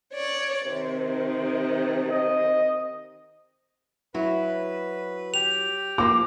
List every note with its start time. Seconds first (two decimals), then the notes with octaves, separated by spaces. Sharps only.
0.12 C#5 D5
0.67 C3 D#3
2.11 D#5
4.14 F#3 E4 F#4 B4
5.34 G4 F7
5.98 F3 A#3 D6